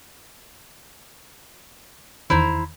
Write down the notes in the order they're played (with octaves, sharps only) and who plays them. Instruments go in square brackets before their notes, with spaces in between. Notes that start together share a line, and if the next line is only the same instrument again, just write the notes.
[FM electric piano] E2 D#3 [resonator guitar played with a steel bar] E4 C5 A#5